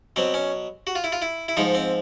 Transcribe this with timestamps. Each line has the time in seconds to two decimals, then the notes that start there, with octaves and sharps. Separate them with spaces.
0.16 B2 F#3 C4
0.34 C#4
0.87 F#4
0.95 F4
1.04 E4
1.12 F4
1.22 E4
1.48 E4
1.57 G#2 F3 D#4
1.75 C4